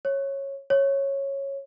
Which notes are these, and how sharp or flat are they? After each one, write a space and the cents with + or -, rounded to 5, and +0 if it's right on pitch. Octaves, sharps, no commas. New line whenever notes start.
C#5 -15
C#5 -10